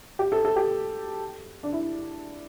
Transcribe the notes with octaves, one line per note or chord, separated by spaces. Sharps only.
G4
A4
A4
G4
D4
E4